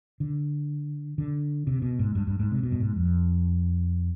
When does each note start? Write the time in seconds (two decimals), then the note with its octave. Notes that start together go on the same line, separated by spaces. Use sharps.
0.20 D3
1.18 D3
1.67 C3
1.82 B2
1.99 G#2
2.15 G2
2.27 G2
2.39 G#2
2.51 C3
2.63 B2
2.72 G2
2.80 G#2
2.96 F2